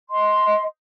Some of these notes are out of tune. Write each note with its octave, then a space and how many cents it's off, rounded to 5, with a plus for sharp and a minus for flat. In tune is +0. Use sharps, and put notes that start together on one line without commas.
D#5 +20 C6 +0